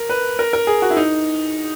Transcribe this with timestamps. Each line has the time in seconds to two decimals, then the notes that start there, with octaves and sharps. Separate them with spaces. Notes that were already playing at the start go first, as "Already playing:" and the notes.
Already playing: A#4
0.09 B4
0.39 A#4
0.53 A#4
0.67 G#4
0.82 F#4
0.91 E4
0.97 D#4